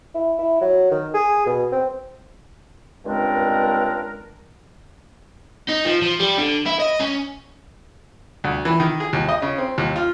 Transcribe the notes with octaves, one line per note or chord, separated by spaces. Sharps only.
E4
E4
F#3
D#3
G#4
B2
C4
C#2 G2 G#3 C4 D4 A#4
D#4
F3
F3
G3
D3
E4
D#5
C#4
D2
E3
D#3
G#4
D#2
D#5
C#3
C4
D#2
F4